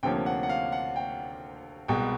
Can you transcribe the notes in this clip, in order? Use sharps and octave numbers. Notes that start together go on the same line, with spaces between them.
D2 C3 F3 A#3 C#4 G5
F#5
F#5
F5
F#5
G5
C2 B2 G#3 G5